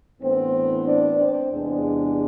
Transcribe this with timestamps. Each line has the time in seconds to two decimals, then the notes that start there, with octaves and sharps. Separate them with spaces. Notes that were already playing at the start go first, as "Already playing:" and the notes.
0.21 A2 E3 B3 C4 D4 C5
0.86 D4 D5
1.19 C4 C5
1.52 E2 C3 G#3 D4